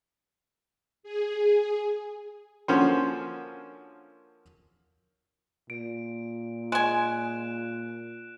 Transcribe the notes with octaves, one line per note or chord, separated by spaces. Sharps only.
G#4
D3 F3 A#3 C#4 F#4 C5
A#2 D7
G#3 G#5 F#6 D7 E7